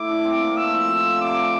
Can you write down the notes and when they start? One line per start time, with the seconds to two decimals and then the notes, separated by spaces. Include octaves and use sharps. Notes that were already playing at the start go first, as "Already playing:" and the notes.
Already playing: A3 E4 D6
0.08 D4
0.24 C4
0.41 A#3
0.57 A3 E6
0.72 F3
0.88 F3
1.05 D3
1.21 C3 D6
1.37 D3